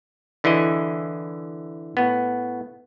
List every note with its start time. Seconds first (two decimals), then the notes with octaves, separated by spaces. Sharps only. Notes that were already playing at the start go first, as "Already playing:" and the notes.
0.44 D3 E3 E4 G#4 D#5
1.97 A2 B3